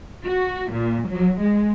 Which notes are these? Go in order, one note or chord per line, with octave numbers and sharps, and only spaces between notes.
F#4
A#2
F#3
G#3